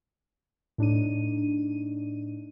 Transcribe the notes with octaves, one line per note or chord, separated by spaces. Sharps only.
A2 D4 D#4 D#7